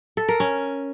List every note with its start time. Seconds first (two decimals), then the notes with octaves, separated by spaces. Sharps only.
0.17 A4
0.29 A#4
0.40 C#4